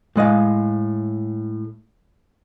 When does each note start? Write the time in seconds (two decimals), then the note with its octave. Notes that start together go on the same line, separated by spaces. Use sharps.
0.16 A2 G#3 D#5 F5